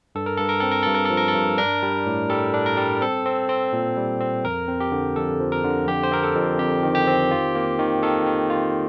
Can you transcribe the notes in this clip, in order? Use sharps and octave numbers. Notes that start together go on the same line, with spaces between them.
G2 A4
A#4
G2 A4
A#4
C4 A4
A#4
G2 A4
A#4
A4
F3
A#4
A4
G2
D4 A#4
G3
A2
G3 A4
D4
A#4
G3
C4 A4
C4
C4
A#2
G3
C4
F2 A#4
C4
G4
D3
F2 A4
F3
A#4
D3
F2 G4
C5
C4 A#4
A4
F2
F2 G4
D#3
G4
C4
F4
A#3
D#3
D#3 A4
D#3
F4